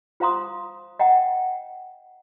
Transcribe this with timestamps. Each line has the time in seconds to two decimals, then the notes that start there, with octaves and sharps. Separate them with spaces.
0.20 F4 C5 F5 A#5 C6 D#6
0.99 D#5 F#5 G5 A#5